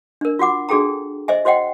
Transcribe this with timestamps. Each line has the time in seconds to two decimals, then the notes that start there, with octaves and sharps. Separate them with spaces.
0.21 D4 A#4
0.39 F4 F#4 F#5 D6
0.69 D4 F#4 G#4 A4 G5 A#5
1.28 C5 D#5 E5 G#5
1.45 F#4 C5 D#5 F#5 G5